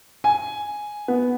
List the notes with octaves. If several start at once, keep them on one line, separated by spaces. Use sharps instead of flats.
G#5
B3